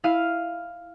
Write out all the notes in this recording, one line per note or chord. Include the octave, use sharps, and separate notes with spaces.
E4 F5 F6 D#7